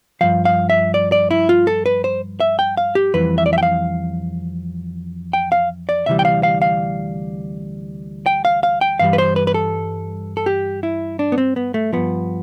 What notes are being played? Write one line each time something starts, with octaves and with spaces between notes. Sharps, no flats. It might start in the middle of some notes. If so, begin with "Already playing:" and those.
G2 F3 F5
F5
E5
D5
D5
E4
F4
A4
B4
C5
E5
G5
F5
G4
F2 E3 G3 B4
E5
D5
E5
G5
F5
G5
F5
D5
D2 C3 E3 G3 E5
G5
F5
F5
F5
G5
F5
F5
G5
G2 E3 G3 F5
B4
C5
B4
B4
A4
A4
G4
E4
D4
B3
C4
B3
A3
G2 F3 B3